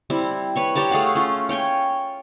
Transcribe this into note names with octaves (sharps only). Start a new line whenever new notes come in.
G3 C4 E4
B4 C#5 C#6
G4 C#5 A5 A#5
A3 G#4 F5 F#5
C#4 F4
C#5 G5 G#5 C#6